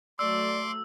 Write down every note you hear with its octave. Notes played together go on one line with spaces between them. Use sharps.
F#3 A3 D5 C6 D6 E6